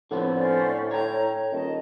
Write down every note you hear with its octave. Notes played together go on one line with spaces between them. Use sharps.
A2 D3 F3 B3 C4
C#4 C5 D5
C#5 G5 A#5
D#1 D#3 D#5 A5